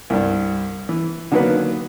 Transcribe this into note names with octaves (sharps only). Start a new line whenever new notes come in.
C2 G2
E3
D3 D#3 F#3 A#3 B3 B4